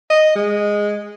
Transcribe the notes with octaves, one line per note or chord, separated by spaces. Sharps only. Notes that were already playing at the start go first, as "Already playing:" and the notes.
D#5
G#3